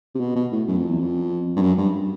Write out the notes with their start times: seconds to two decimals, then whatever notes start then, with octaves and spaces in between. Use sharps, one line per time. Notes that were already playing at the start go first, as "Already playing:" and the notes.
0.15 C3
0.20 B2
0.35 B2
0.51 A2
0.67 F#2
0.78 F2
0.88 E2
0.99 F2
1.56 G2
1.62 F#2
1.78 G2